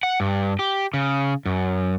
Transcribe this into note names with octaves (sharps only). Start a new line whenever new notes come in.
F#5
G2
G4
C#3
F#2